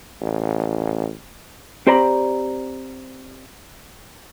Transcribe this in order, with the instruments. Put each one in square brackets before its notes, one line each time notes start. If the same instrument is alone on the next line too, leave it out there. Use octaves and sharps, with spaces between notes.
[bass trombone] A1
[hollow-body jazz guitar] C4 G4 C5 D5 A#5 B5